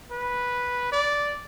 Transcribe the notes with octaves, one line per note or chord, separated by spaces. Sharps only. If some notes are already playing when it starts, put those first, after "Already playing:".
B4
D5